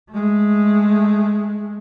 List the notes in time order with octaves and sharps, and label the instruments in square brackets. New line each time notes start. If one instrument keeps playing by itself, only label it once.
[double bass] G#3 A3